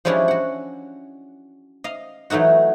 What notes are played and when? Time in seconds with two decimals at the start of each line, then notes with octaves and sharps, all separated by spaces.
0.05 F3 G3 G#3 C#4 D4 E4
0.28 F#4 F#5
1.84 D#5 F5
2.30 E3 F#3 A3 D#4 F#4